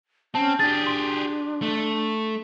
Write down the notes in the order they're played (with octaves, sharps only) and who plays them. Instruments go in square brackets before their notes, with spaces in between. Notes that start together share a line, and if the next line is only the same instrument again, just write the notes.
[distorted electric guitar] C4 [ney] C#4 [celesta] A5
[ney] D4 [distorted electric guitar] G4 G#4 [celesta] A6
[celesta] C6
[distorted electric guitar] A3